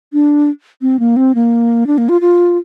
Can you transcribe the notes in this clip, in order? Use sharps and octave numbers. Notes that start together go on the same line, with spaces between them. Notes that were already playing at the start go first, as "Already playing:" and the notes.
D4
C4
A#3
C4
A#3
D4
A#3
F4
F4